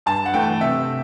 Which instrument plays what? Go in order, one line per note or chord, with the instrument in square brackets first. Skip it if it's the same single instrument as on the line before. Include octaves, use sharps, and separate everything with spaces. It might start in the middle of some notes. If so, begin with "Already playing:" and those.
[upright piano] G2 A5
F#5
E3 A3 G5
C3 E5